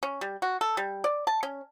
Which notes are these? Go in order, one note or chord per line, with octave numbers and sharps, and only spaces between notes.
C#4
G3
F#4
A4
G3
D5
A5
C#4